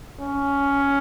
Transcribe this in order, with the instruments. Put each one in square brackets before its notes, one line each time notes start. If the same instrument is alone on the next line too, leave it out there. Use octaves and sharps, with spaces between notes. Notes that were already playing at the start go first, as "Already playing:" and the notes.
[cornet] C#4